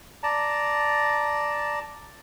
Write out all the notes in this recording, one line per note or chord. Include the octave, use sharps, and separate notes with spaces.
D5 A5 A#5